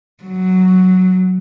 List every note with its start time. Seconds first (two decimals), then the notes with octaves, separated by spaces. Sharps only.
0.24 F#3